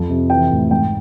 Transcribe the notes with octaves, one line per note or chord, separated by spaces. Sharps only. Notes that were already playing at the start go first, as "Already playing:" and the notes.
Already playing: F2 F3
C3
E3 G5
A2
G#2 G5